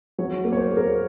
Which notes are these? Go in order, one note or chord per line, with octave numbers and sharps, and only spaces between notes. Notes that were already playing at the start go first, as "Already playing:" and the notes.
F#3 C#5
A#3
C#5
C5
A#3
A#4